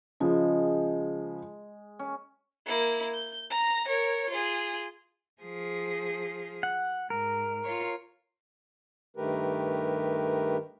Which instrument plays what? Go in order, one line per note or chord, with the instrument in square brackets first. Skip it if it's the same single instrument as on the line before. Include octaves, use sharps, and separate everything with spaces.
[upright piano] C#3 F3 [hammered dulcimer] G#3
[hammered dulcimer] C#4
[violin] A#3 E4
G6
A#5 A#6
A#4 C#5
F4 G#4
[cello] F3 G#4
[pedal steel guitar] F#5
[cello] G#2 [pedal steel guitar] A#4
[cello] F4 C#5
[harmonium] G2 D#3 A3 G4 A#4 B4